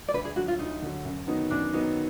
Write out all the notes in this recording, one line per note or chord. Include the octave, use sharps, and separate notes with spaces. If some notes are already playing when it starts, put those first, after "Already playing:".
D5
D2 B4
G#4
D3 F#3 F#4
F4
D2 D#4
D3 F#3
F#2
D#3 F#3 B3 D#4
F#2 D4
D#3 F#3 B3 D#4